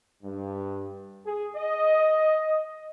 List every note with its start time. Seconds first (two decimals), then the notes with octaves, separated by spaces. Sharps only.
0.23 G2
1.26 G#4
1.55 D#5